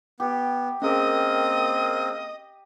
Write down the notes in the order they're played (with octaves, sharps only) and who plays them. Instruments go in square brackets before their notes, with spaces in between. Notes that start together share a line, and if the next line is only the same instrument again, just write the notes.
[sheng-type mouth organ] B3 [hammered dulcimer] G4
[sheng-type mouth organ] A#3 C4 [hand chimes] C#4 G#4 A#4 [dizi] D#5